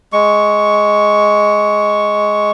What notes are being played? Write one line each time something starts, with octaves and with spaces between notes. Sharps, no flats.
G#3 C#6